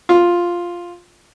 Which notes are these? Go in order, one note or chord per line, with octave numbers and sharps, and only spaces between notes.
F4